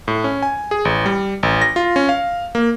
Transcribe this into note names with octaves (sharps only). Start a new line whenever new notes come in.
A2
C#4
G#5
G#4
A1
G3
A1
A#6
F4
C#4
F5
A#3